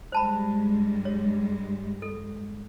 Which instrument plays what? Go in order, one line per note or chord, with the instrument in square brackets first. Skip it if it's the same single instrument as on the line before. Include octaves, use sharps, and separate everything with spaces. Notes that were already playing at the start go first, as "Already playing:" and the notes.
[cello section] G2 G3 G#3 [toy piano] C5 A5 B5
[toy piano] C#5
A4